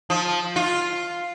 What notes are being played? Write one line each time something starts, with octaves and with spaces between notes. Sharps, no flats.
F3
F4